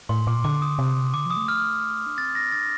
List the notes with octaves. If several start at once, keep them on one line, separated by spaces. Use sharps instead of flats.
A2 C6
A#2 D6
D3 D6
D#6
C3
D3 D6
F3 D#6
A3
F6
D4
C4 A6
A#6
D4 A6